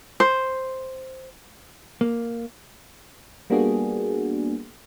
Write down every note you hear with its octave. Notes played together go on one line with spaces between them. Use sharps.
C5
A#3
G3 A#3 B3 D4 F#4 G#4